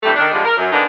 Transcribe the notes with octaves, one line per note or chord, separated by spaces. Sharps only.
G2 C3 E3 G3 A3
D#3 D4
D3 F3 G3 G#3
A#4
F#2
D3 E3 A#3 B3 D4 D#4